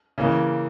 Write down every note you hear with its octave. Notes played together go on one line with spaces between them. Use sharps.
C#3 E3 A#3